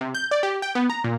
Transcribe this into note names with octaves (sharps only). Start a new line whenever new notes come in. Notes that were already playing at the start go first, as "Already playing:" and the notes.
C3
G6
D5
G4
G5
B3
A#5
A#2